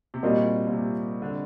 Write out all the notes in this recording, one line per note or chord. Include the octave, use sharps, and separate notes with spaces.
C3
A#2 G3 C4 F#4 A#4 D#5
A#2
C3
D3